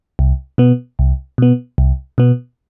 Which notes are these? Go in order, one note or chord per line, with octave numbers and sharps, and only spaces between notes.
C2
B2 B3
C2
B2 B3
C2
B2 B3